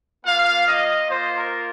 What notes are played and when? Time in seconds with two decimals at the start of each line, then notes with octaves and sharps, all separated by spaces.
0.25 A#3 F4 F5
0.67 D#5
1.10 A#3 F4 C5
1.38 A#4